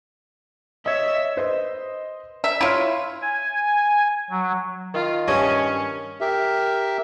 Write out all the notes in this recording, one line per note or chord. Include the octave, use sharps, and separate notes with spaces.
C#5 D#5 E5
B4 C5 D#5
E5
E4 F4 C#5 E5 F6
G#5
F#3
D#3 F4
G2 C#4 C#5 E5 A5 C#6 D#6
G4 A#4 E5